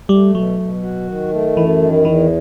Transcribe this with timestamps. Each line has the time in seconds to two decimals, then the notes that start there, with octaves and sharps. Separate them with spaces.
0.09 G3 A3
0.34 B2 F#3
0.59 B2
0.83 F#4
1.07 D#3
1.32 A3
1.57 F#2 E3
1.82 D#3
2.05 E2 E3